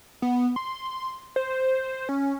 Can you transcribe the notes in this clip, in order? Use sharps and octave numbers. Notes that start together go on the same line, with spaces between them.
B3
C6
C5
C#4